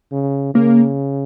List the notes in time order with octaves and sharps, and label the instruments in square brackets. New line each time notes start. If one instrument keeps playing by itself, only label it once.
[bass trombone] C#3
[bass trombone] C#3 [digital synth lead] A#3